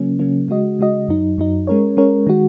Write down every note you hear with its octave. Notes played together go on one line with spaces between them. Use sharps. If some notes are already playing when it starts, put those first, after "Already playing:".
Already playing: C#3 F#3 A#3 C#4
C#3 F#3 A#3 C#4
C#3 G#3 F#4 D#5
C#3 G#3 F#4 D#5
F#2 F#3 D#4
F#2 F#3 D#4
G#3 C#4 A#4 C#5
G#3 C#4 A#4 C#5
D#3 G#3 F#4